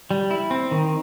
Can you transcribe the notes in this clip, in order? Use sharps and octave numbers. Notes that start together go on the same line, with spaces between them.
G3
E4
C4
D#3